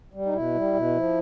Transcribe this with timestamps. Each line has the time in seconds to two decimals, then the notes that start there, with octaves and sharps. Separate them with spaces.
0.14 G3
0.26 D#4
0.33 B2 E4
0.54 G3
0.74 B2
0.95 F3